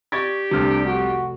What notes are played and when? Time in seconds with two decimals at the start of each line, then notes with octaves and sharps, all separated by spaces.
0.12 G4 D5 C#6 G#6 A6
0.51 F1 C2 C3 D4 F6
0.86 F#4